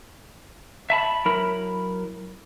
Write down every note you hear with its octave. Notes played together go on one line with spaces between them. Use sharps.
E5 A5 B5
F#3 E4 A#4 B5